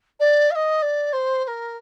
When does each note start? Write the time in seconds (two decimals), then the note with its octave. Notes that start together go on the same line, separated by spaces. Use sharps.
0.20 D5
0.51 F5
0.55 D#5
0.82 D5
1.13 C5
1.44 C5
1.47 A#4